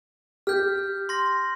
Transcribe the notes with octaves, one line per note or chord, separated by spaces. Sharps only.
G4 F6 G6
C6 A#6